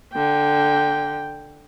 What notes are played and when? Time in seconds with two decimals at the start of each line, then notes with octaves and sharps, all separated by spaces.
0.14 D3 G5